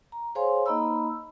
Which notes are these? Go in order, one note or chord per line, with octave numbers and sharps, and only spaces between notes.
A#5
G#4 C5 C#5 F5 G#5 C6
A#3 D#4 D#5 A#5 B5 E6